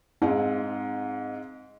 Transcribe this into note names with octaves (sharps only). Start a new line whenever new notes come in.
G#2 C4 D#5 F5